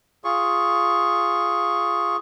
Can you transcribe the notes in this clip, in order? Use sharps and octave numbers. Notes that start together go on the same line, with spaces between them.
F4 G#4 C#6